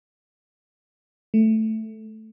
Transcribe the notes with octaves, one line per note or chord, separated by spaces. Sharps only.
A3